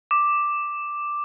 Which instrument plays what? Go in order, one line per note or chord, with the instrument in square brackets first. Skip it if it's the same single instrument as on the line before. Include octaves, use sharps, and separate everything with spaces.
[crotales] D6